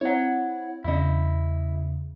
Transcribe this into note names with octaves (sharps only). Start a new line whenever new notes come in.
C4 E4 C#5 F#5
E2 C#3 E4 D#5